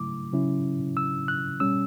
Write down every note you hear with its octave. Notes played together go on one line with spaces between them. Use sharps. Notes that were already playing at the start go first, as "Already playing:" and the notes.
Already playing: C#3 F#3 A3 E4 D6
C#3 F#3 C#4 E4
E6
F#6
B2 G3 C#4 E6